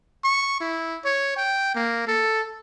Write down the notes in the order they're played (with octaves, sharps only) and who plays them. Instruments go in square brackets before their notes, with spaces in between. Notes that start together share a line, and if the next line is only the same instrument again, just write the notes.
[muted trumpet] C#6
E4
C#5
G5
A#3
A4